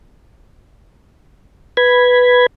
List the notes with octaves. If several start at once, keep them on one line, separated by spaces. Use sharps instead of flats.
B4 B5 G#6